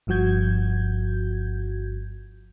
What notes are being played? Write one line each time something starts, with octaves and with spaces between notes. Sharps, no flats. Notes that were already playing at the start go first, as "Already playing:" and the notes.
G1 G2 F3 F#4 G6 G#6